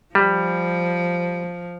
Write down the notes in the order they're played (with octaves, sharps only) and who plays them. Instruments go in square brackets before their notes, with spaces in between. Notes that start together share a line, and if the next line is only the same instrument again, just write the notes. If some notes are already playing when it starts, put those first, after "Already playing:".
[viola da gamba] F3 [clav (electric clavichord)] G3